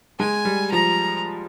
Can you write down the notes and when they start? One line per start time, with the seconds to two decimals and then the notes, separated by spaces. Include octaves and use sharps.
0.19 G#3 G#5
0.45 G3
0.71 F3 A#5